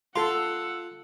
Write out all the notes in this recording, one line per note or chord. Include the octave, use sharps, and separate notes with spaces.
F4 A4 F#5 C6 E6